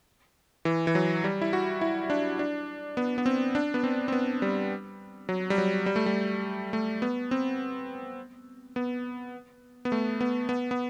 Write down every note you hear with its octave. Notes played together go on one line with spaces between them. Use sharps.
E3
E3
F#3
G3
E4
F#4
E4
D4
D4
B3
B3
C4
D4
B3
C4
C4
B3
G3
F#3
G3
F#3
G3
A3
G3
A3
B3
C4
B3
B3
A3
B3
B3
B3